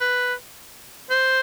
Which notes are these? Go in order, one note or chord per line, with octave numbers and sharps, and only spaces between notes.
B4
C5